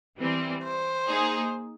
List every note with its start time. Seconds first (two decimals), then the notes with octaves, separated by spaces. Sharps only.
0.18 E3 G3 C4
0.63 C5
1.08 A#3 D#4 G#4